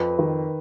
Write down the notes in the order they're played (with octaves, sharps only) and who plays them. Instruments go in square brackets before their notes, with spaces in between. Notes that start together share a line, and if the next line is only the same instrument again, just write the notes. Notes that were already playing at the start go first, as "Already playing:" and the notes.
Already playing: [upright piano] F2 [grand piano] B4
[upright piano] D#3